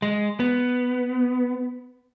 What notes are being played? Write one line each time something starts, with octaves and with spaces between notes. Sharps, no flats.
G#3
B3